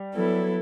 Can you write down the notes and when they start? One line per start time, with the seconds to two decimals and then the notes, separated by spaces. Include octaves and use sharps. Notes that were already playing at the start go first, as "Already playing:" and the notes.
Already playing: G3
0.14 F#3 B3 E4 A4